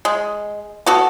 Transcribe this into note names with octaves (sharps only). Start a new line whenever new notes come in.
G#3
B3 F#4 A4